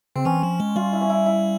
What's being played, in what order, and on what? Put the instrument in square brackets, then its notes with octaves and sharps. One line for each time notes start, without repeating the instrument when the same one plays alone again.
[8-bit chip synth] C#3 [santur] C4
[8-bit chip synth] E3 [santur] C#4
[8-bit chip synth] F3
G#3
[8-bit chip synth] G3 [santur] F4
[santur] E4
C#4
E4
E4